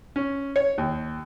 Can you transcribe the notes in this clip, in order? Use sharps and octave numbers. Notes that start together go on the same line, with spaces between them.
C#4
C#5
D#2